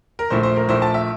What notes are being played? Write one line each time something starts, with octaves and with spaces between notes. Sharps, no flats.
A#4
A#1 A#2 A3 E4 C5
C5
A#4
A#1 A#2 A3 E4 C5
A5
E5